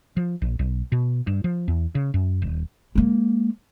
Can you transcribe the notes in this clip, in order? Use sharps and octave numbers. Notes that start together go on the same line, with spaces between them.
F3
A#1
B1
B2
G2
F3
E2
C#3
F#2
D#1
G#3 A#3